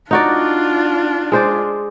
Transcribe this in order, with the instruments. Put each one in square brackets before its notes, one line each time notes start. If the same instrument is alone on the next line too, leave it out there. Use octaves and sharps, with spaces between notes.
[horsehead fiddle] D4 F4 [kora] D#4 F#4 D5
[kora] G#3 C5 D5